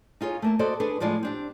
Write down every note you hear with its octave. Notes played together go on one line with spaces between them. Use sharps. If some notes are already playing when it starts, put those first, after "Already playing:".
D#4 F4 G#4 C#5
A3 A#3 A5
F#4 A4 C5 D5 D#5
D4 G#4 A4 B4
A2 F3 G#3 F4 D5
C4 D4 G4